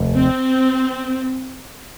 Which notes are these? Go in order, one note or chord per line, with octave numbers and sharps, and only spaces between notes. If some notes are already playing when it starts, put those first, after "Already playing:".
Already playing: F1 D#2 A3
C4